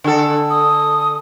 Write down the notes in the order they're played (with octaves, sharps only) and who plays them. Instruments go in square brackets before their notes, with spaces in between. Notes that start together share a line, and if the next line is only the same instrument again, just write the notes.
[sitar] D3 A4 [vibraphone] G#5 A5
[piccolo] D#6